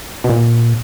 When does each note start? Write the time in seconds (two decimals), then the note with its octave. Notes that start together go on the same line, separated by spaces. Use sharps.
0.24 B2
0.30 A#2